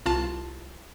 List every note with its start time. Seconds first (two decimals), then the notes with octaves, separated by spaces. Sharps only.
0.06 C2 F4 A5